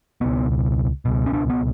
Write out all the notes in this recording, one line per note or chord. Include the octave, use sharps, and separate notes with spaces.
C#2 B2 B3
C#2 B2
C#4
D4
B3